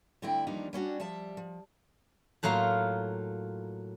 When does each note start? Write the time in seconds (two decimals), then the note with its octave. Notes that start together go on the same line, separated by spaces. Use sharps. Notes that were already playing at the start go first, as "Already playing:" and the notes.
0.22 D3 A3 C4 E4 G5
0.47 D#2 E3 F3 G3 D4 D#4
0.73 G3 C#4 D4 F#4
1.00 F3 G3 E5 A5
1.37 F3
2.43 A2 F#3 A#3 F4 A#4 C6